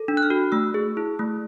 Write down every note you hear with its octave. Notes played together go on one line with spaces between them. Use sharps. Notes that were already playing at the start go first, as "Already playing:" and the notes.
Already playing: A4
D4
F#6
F6
F#4
A3 E6
G#4
E4
A3